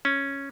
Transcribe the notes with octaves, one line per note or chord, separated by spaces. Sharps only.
C#4